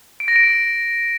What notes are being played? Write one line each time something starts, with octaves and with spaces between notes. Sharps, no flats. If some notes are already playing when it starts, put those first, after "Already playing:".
D7
A#6
D7
A#6